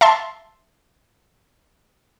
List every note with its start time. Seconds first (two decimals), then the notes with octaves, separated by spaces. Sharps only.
0.01 E5 A5 C6